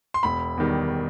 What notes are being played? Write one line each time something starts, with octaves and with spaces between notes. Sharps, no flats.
C6
E1 B5
E2 D#3 G3